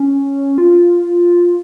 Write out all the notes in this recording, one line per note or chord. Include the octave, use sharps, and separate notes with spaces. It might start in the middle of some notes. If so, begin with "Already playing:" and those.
Already playing: C#4
F4